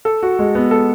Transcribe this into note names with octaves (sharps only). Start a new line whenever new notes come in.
A4
F#4
G#3
B3
A4